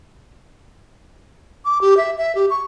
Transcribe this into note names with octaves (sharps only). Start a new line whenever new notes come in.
D6
G4
E5
E5
G4
C#6